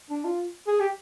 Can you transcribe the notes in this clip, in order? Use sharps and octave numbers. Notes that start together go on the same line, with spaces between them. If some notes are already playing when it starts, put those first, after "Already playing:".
D4
F4
G#4
G4